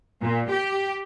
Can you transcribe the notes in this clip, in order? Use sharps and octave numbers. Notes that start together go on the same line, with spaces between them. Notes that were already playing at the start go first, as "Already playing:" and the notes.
A#2
G4